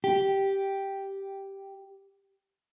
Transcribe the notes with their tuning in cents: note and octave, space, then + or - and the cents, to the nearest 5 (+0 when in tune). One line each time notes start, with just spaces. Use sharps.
G4 -5